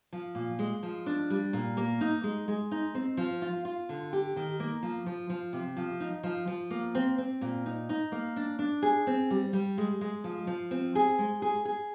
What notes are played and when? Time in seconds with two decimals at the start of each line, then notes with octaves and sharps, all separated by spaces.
0.13 F3
0.35 A#2
0.59 G#3
0.83 F3
1.06 D4
1.30 G3
1.53 A#2
1.77 A#3
2.01 D#4
2.23 G#3
2.48 G#3
2.71 D#4
2.95 C4
3.17 F3
3.42 F4
3.65 F4
3.89 D3
4.13 G4
4.36 D#3
4.60 A#3
4.83 F3
5.06 F3
5.30 F3
5.53 C3
5.77 F3
6.00 D#4
6.23 F3
6.48 F3
6.70 A#3
6.95 C4
7.18 C4
7.41 A#2
7.66 D#4
7.89 D#4
8.12 A#3
8.36 D4
8.59 D4
8.82 G#4
9.07 C4
9.31 G3
9.53 G3
9.78 G#3
10.01 G#3
10.24 F3
10.47 F3
10.71 C4
10.95 G#4
11.19 G#3
11.42 G#4
11.65 G#4